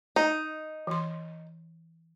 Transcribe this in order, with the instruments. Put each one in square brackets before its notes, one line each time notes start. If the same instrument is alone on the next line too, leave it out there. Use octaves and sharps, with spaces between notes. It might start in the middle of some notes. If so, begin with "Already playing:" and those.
[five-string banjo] D#4
[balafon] E3 C6